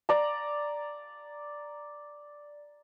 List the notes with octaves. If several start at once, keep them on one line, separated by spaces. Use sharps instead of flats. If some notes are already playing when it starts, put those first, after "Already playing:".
D5 A#5